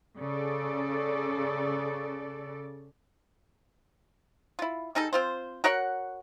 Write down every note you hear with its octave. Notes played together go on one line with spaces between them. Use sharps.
C#3 A4 D5
E4 F4
G3 D#4 G#4 A4
C4 F4 C5
F#4 A#4 C#5 F#5